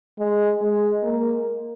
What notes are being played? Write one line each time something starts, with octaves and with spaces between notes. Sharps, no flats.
G#3
G#3
A#3